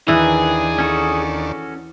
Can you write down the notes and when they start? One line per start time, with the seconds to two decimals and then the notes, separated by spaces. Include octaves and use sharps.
0.08 D#2 D#3 E3 D4 G#4 B4 E6
0.78 C#4 F#4 A4